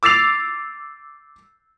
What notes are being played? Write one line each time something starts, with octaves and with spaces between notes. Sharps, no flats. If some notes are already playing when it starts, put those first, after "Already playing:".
D6 E6 A6 C7 F7